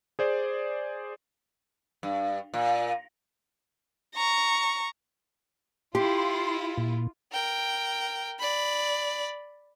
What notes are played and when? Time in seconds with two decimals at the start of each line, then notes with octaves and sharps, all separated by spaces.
0.19 G#4 C5 D5
2.03 G2
2.54 A#2
4.15 A#5 C#6
5.95 E4 F4 G4 C6
6.78 A#2
7.32 A#4 G5
8.40 D5 B5